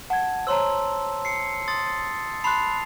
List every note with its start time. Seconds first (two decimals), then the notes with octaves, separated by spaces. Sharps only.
0.10 F#5 A5 G#6
0.47 C5 C#5 A5 A#5 C6 E6
1.25 C7 C#7
1.68 C6 D#6 A6
2.44 A5 B5 C6 F#6 C7 F7